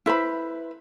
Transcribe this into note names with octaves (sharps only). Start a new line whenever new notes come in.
E4 B4 C5 B5